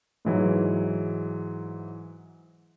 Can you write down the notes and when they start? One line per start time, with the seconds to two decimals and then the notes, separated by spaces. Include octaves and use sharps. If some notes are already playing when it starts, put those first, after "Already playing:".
0.25 G#2 E3 F#3